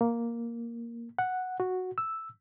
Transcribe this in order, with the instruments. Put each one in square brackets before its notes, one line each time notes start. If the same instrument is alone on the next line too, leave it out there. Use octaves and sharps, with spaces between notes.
[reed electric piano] A#3
F#5
F#4
E6